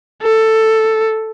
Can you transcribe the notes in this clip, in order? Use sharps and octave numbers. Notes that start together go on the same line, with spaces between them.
A4